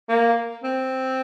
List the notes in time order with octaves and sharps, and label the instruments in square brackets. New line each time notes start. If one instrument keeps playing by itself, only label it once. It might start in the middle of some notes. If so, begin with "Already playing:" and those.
[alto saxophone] A#3
C4